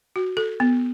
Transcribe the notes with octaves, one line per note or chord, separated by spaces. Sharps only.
F#4
A4
B3